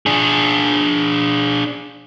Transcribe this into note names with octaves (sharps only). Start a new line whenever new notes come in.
D4 G#4